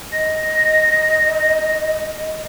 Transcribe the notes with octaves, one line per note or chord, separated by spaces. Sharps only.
D#5 A#6